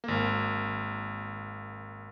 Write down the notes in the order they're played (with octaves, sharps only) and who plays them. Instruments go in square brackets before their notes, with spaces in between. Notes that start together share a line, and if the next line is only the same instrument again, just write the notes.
[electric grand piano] G#1 A#3